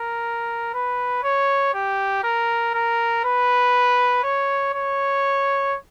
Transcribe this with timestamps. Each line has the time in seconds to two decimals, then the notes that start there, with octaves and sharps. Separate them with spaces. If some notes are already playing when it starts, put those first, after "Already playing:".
Already playing: A#4
0.74 B4
1.23 C#5
1.74 G4
2.23 A#4
2.74 A#4
3.24 B4
4.23 C#5
4.73 C#5